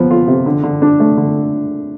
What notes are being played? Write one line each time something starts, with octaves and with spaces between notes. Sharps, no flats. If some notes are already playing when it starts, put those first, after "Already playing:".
Already playing: F3 B3
F4
C3
D3
D3
D4
A3
D3